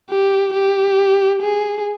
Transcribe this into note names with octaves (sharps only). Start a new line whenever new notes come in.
G4
G4
G#4